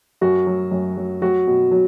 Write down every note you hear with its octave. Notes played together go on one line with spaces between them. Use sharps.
F#2 F#4
F#3
F#2
F#3
F#3 F#4
B2
F#3